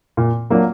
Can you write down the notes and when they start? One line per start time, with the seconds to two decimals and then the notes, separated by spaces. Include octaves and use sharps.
0.17 A#2
0.50 F#3 A#3 D4 F4